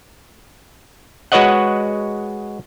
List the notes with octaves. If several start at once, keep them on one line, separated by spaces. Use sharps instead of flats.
G#3 F#4 B4 C#5 D#5 F#5